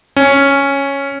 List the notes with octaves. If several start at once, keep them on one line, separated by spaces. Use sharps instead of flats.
C#4